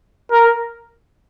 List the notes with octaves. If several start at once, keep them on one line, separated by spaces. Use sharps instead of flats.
A#4